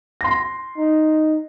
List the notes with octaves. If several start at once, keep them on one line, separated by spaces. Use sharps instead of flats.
C6 A#6
D#4